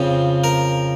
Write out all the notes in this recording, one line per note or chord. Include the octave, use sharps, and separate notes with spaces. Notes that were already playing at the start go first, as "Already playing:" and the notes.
Already playing: F2 C#3 F3 C4
A#4